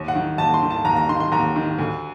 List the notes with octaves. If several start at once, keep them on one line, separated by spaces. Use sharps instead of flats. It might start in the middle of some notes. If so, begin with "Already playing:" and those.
Already playing: D#2
F#5
D#3
D#2 A5
C6
D#3
A5
D#2 A#5
A#5
D#3 C6
C6
D#2 A#5
D#3
D2